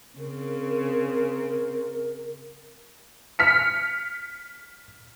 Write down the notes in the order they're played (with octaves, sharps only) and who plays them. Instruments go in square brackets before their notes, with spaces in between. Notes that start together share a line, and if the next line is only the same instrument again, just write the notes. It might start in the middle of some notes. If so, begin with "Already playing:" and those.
[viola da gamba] C#3 C4 [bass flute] A#4
[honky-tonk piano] F6 B6 C#7